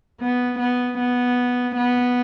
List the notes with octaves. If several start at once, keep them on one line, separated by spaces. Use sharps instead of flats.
B3
B3
B3
B3